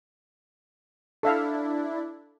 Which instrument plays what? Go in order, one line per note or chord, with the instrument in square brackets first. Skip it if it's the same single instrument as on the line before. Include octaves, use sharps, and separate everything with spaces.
[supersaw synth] D4 E4 [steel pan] A4 E5 F5